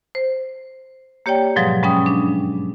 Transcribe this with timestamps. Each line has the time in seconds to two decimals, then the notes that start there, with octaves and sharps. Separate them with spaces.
0.15 C5
1.26 A#3 G4 C#5 D5 G5
1.56 G#2 B2 F3 F#3 G#3
1.83 G2 G#3 C#4 G5 C#6 D#6
2.06 D4